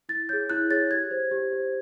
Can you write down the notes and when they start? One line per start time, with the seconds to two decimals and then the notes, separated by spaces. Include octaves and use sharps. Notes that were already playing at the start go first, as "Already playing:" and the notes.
0.09 E4 A6
0.29 G#4 C#5 G6
0.50 E4 F#6
0.70 G#4 C#5 A6
0.91 G4 G#6
1.11 C5
1.31 G4
1.53 C5